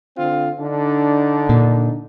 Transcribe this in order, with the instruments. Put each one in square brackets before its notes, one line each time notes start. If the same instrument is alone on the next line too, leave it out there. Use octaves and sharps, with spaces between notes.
[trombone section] D3 C4 F4
D3 D4 D#4
[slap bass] A#2